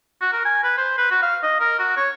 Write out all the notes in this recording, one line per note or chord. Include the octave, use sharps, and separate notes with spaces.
F#4
A#4
G#5
B4
C5
B4
F#4
F5
D#5
A#4
F#4
C#5